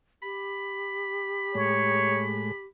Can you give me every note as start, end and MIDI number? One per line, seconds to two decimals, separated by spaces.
0.23 2.65 67
0.23 2.66 83
1.55 2.52 45
1.55 2.52 56
1.55 2.28 73